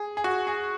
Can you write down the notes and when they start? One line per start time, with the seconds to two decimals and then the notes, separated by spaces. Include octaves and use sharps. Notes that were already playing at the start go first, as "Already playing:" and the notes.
Already playing: G#4
0.17 G#4
0.24 F#4
0.47 G#4